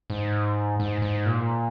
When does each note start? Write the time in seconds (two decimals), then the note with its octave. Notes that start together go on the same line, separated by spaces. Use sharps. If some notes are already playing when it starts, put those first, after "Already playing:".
0.10 G#2
0.80 G#2
1.02 G#2
1.26 A#2